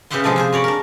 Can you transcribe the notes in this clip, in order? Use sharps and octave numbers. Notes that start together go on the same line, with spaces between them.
C#3 B3 G4 E5 F#5 C6
C3 F3 G#3 D4 A4
F4 G#4 C5
F#4 C#5 D5 B5
D4 A#4